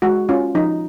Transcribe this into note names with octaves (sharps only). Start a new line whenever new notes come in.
G#3 F#4
C#4 F4
F3 D#4